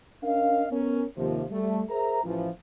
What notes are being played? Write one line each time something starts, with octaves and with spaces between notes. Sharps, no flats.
C#4 D4 A#4 D#5 F5
B3 C#4 A#4
D#2 C3 F3
G3 A3
G#4 A#4 C5 E5 A#5
A1 E3 F3